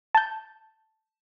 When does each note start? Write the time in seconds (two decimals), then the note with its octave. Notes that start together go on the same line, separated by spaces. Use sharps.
0.15 A5 G6